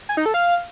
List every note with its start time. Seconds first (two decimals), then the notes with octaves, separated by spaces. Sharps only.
0.09 G#5
0.17 D#4
0.26 A4
0.34 F5